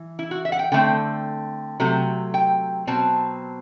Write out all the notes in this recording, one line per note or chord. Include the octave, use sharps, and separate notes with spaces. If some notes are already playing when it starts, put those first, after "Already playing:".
Already playing: E3
E4
F#4
E5
F#5
G5
D3 A3 C4 G5
C3 F#3 A3
G5
B2 F#3 C4 A5